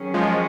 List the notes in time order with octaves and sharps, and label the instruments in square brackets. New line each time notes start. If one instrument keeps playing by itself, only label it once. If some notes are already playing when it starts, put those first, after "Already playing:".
Already playing: [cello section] D#3 F#3 C#4 G#4
[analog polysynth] F3 G#3